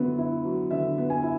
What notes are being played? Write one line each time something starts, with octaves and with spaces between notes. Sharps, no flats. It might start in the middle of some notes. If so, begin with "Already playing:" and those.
Already playing: D3 F#3 B3 E4
E4
F#3
D3 E5
B3
G#5
E4